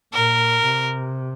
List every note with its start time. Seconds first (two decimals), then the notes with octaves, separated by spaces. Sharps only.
0.13 A#2 A#4
0.64 C3